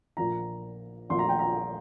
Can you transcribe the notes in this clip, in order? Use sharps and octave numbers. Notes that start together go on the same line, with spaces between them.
A#1 A#2 F3 A#5
A#1 A#2 F3 C6
A#5
G5
A#5